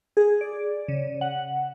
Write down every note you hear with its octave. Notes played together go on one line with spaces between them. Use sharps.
G#4
D5
C#3
F#5